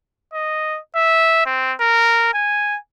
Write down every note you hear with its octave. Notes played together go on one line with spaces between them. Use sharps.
D#5
E5
C4
A#4
G#5